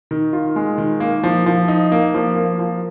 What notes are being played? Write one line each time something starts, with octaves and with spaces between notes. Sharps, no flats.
D#3
F4
G#3
D#3
A#3
F3
F3
D#4
A#3
F3
A#3
F3